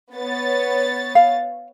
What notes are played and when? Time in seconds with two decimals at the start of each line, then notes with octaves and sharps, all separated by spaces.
0.14 B3 C#5 A6
1.15 F5